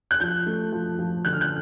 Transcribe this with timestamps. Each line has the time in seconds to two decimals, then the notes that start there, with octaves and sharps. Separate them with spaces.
0.11 F#6
0.20 F3 G6
0.46 A3
0.72 F3
0.99 F3
1.25 D3 F#6
1.33 F6
1.41 F#6